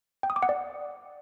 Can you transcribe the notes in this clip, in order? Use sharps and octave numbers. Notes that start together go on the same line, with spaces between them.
G5
D#6
D6
F#5
D5